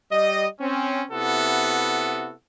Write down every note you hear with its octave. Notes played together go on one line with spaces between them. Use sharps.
G3 D#5
C4 C#4
C3 B3 E4 F#4 A4